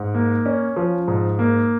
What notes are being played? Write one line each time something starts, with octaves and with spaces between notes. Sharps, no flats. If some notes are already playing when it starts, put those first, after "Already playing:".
Already playing: G#2
A#3
C#4
F3
G#2
A#3